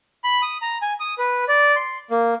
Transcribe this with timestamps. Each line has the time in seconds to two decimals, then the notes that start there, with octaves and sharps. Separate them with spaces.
0.24 B5
0.42 D#6
0.62 A#5
0.82 G#5
1.00 D#6
1.18 B4
1.48 D5
1.76 C6
2.11 A#3